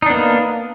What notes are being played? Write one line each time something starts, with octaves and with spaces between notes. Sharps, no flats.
A#3 B3 D4 D#4